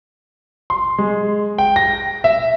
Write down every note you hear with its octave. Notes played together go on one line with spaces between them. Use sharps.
C6
G#3
G5
A#6
E5